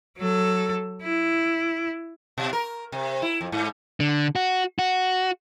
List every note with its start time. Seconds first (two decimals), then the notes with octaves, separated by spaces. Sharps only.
0.17 F#3 A4
1.03 E4
2.38 B2
2.53 A#4
2.92 C3
3.22 E4
3.41 F2
3.52 G#2
4.00 D3
4.35 F#4
4.79 F#4